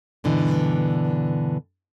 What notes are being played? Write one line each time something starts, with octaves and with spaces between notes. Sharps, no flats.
G2 B2 D3 E3